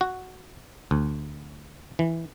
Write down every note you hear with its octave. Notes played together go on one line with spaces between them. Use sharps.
F#4
D2
E3